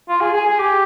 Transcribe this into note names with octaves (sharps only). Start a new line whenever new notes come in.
F4
G#4
G#4
G#4
G4